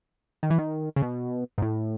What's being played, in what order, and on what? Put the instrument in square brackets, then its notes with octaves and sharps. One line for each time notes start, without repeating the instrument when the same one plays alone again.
[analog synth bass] D#3
E3
D#3
C#3
B2
G#2
A2